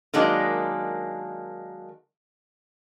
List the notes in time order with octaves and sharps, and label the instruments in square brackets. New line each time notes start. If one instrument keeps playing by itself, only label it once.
[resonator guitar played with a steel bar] D#3 F#3 G#3 A#3 D4